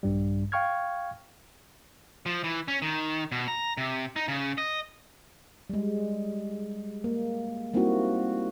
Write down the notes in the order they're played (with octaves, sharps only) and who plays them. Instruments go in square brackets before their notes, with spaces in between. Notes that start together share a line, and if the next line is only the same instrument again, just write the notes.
[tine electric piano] A#1 G2 G3
F5 G5 C#6 F6 G#6
[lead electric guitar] F3
E3
C#4
D#3
B2
A#5
C3
D#4
C#3
D#5
[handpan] G3 G#3
A#3
G3 A#3 C4 D#4 E4 F#4